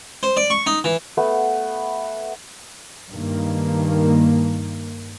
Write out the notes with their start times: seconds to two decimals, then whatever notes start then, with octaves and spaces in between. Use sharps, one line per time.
0.23 C5
0.37 D5
0.50 C#6
0.66 D#4
0.84 E3
1.17 A3 B3
3.12 G2 D#3 A#3